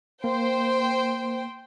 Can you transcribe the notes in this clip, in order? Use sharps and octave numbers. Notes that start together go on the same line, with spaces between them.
A#3 C5 G5